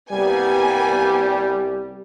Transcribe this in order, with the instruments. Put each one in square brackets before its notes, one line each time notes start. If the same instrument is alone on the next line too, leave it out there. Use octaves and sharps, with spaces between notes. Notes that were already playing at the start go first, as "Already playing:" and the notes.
[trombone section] C2 G3 [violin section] A#3 B3 G#5